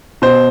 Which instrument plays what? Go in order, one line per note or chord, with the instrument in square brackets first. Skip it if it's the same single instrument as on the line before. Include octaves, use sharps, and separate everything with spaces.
[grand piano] B2 C5